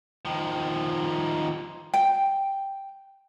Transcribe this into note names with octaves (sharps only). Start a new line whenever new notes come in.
D#3 F3
G5